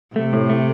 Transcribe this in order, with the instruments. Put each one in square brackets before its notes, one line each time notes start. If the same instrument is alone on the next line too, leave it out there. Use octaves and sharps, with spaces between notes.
[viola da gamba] C3 [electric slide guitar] A3
[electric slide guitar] A2
A3